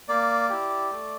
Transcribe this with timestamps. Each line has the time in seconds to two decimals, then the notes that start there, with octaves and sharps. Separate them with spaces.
0.09 A#3 D5
0.50 E4 G4
0.91 A3